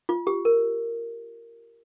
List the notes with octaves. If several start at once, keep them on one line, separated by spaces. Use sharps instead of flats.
F4
G4
A#4